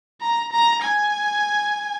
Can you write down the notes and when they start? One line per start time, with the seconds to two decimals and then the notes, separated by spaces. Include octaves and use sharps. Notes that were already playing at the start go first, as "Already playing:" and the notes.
0.21 A#5
0.52 A#5
0.82 G#5